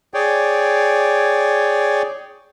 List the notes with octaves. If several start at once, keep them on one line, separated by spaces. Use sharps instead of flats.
G#4 C#5 D5 G5